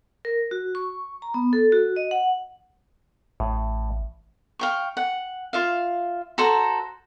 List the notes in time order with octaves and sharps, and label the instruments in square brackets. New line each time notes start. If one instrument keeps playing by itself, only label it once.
[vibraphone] A#4
F#4
C#6
A#5
B3
A4
F#4
D#5
F#5
[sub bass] A1 [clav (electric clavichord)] A2
[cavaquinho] F5 G5 C#6
F#5
F4 E5 F5
F#4 A4 C5 A#5